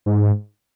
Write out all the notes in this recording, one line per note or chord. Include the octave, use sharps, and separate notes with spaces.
G#2